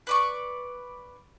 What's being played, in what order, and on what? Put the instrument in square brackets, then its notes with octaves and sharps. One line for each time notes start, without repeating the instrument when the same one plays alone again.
[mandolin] B4 D5 C#6